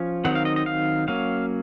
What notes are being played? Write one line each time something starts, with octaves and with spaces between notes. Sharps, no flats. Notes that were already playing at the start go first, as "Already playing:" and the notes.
Already playing: F3 C#4
D#3 F#3 C4 D#4 F#5
F5
D#5
D#5
F5
F#3 A#3 C#4 F5